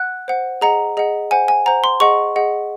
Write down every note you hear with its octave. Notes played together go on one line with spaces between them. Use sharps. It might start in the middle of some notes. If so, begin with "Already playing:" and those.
Already playing: F#5 F#6
C5 F#5
G#4 D#5 F#5 A#5
G#4 D#5 F#5
C5 F#5 G#5
G#5
C5 F#5 A#5
C6
G#4 D#5 F#5 C#6
G#4 D#5 F#5